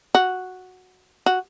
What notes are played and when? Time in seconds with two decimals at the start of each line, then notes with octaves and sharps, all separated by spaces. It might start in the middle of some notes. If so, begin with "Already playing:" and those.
0.15 F#4
1.26 F#4